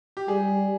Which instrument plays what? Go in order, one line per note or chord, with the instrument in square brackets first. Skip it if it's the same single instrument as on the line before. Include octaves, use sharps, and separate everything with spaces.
[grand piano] G4
[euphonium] G3 [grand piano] G#4